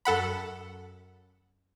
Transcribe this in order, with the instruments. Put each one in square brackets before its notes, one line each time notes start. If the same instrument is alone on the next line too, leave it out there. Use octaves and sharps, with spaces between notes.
[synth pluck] F#2 A4 F#5 B5